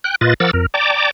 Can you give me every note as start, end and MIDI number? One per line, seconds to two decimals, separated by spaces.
0.04 0.16 79
0.04 0.16 90
0.21 0.34 46
0.21 0.34 65
0.21 0.34 71
0.21 0.34 75
0.21 0.34 93
0.40 0.51 53
0.40 0.51 70
0.40 0.51 78
0.40 0.51 86
0.40 0.51 88
0.40 0.51 93
0.53 0.66 41
0.53 0.66 70
0.74 1.11 74
0.74 1.11 79
0.74 1.11 81
0.74 1.11 82
0.74 1.11 86